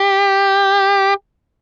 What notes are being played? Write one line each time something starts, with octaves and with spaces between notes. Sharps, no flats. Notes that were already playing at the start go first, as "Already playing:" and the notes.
Already playing: G4